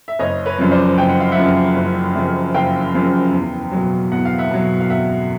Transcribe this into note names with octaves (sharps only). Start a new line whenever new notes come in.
E5
F#1 C#5 D#5
B4 C#5
F#2 C#3 F3
C5 D5
F#1 G5
F#5
F5
E5 F#5
F#2 C#3 F3
F#1
F#2 C#3 F3
F#1 F5 G5
F#2 C#3 F3
E2
B2 F#3
E2 F#5
F5
E5 F#5
B2 F#3
F5
E2 E5 F#5